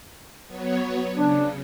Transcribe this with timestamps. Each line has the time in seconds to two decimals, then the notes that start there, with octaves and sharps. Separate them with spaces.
0.47 F#3 B3 C#5
1.16 C#3 D4